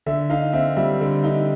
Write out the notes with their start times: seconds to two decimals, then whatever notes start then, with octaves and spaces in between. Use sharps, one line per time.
0.06 D3 E5
0.30 D#4 F5
0.53 C4 E5
0.77 G3 E5
1.01 D3
1.24 D#4